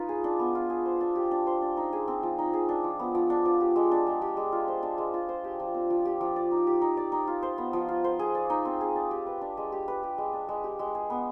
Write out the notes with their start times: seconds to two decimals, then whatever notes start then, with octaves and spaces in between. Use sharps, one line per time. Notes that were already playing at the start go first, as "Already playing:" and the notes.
Already playing: D#4 F4 B4
0.09 G#4
0.24 D4
0.39 B3
0.55 F4
0.70 G#4
0.85 C5
1.01 D4
1.15 G4
1.31 D4
1.47 C5
1.62 D4
1.77 D#4
1.93 G#4
2.08 C4
2.23 F3
2.38 D#4
2.53 G#4
2.69 D4
2.84 F3
2.99 B3
3.15 F3
3.30 D4
3.45 F3
3.61 G4
3.76 G#3
3.91 D4
4.07 G#3
4.22 G4
4.37 G#3
4.52 F4
4.68 C5
4.83 D4
4.98 G#3
5.14 F4
5.29 C5
5.44 G4
5.60 F3
5.74 C4
5.90 F3
6.05 G4
6.21 F3
6.36 D5
6.51 D#4
6.67 G4
6.81 D#4
6.97 D5
7.12 D#4
7.28 F4
7.43 C5
7.58 B3
7.73 F3
7.89 F4
8.04 C5
8.19 G#4
8.35 D5
8.50 D#4
8.65 C4
8.81 G#4
8.96 D5
9.11 G4
9.27 B4
9.41 D4
9.57 G#3
9.72 G4
9.88 B4
10.03 G4
10.18 G#3
10.33 D4
10.49 G#3
10.64 G4
10.79 G#3
10.95 G#4
11.10 B3